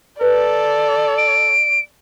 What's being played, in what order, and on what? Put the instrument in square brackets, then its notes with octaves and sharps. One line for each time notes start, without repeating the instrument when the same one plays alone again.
[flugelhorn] A4 [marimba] B4 [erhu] D5
[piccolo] D7